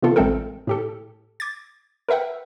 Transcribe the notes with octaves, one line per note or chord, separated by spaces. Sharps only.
C3 E3 B3 F4 A4
A1 G#3 A3 C4 A4 A#4
A2 G4 A4
D6 G#6 A6
A#4 B4 E5 F#5 G5